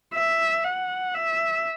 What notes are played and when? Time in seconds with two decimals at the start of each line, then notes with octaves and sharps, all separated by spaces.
0.14 E5
0.64 F#5
1.14 E5